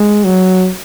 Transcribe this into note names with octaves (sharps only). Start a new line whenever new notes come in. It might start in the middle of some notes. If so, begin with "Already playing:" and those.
Already playing: G#3
F#3